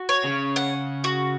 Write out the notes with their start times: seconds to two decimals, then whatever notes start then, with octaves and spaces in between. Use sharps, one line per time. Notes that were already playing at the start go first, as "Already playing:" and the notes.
Already playing: F#4
0.09 C#5
0.25 C#3
0.56 F#5
1.04 F#4